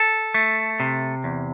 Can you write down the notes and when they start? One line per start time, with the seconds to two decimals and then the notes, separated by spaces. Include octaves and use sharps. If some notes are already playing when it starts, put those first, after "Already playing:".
Already playing: A4
0.34 A3
0.80 C3
1.24 E2